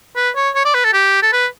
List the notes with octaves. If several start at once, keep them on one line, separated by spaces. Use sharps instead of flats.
B4
C#5
C#5
D5
B4
A4
G4
A4
B4